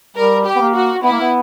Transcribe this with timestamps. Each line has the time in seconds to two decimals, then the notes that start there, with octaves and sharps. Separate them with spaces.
0.16 G3 A#4
0.46 G4
0.56 B3
0.61 A#3
0.75 F#4
1.03 B3 E4
1.12 A#3
1.20 B3